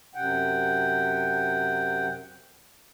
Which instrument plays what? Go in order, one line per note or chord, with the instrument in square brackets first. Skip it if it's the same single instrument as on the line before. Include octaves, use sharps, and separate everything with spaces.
[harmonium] F#2 C3 F#5 G5